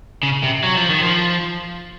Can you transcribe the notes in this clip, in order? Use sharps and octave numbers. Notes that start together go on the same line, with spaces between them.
C#3
C3
F#3
F3
D#3
F3